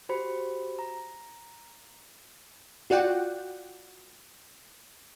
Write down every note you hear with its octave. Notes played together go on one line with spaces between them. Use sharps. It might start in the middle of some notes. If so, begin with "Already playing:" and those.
F#4 G4 C5 B5 C#7
A#5
F4 F#4 D5 F#5 G5